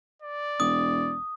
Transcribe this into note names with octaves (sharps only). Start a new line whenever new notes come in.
D5
E1 D#6